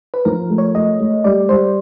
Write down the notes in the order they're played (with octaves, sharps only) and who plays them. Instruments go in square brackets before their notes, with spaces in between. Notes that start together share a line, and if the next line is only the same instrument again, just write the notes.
[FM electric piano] B4
[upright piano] F3 [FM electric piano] A#4
[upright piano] A3
[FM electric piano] C#5
[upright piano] A3 [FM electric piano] D#5
[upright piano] A3
[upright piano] G3 [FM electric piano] D5
[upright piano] G3 [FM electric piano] C5